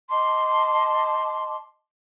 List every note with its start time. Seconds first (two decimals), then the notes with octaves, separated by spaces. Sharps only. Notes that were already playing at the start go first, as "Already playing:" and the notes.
0.09 D#5 A5 C6 D6